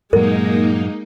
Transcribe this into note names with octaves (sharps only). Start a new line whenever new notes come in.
G2 A#2 F#3 G#3 A#3 D#4 A#4